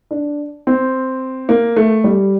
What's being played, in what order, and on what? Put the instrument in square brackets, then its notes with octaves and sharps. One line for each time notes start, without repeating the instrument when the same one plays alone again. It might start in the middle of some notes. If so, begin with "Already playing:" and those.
[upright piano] D4
C4
A#3
A3
G3